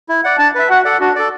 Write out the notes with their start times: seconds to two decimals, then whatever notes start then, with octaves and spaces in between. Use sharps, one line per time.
0.09 E4
0.24 D5 F#5
0.39 D4 A5
0.55 B4 E5
0.70 F#4 F#5
0.85 A4 D5 F#5
1.01 D4 F#4
1.16 A4 D5